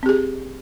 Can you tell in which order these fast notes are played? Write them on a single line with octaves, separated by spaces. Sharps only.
C4 G4 G#4